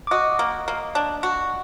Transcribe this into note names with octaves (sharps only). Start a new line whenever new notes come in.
D6
F#4 D#5 D#6
A#3
A#3
D4
F#4